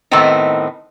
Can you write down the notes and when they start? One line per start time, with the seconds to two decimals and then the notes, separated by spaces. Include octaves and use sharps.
0.11 A2 D#3 A3 B3 C4 D#4